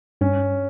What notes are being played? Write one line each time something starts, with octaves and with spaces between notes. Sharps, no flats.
G2 C#4